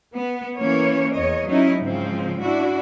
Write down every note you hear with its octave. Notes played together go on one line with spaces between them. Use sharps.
B3
E3 A#3 C#4 C#5
E2 C#5 D#5
F#3 C#4 D#4 E4
G#2 C#3 F3 C4
D4 E4 F#4